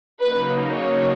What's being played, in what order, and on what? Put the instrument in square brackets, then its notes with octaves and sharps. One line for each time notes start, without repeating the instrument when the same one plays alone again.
[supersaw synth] C#3 F#3 A#3 D#4 [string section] B4
[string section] C#5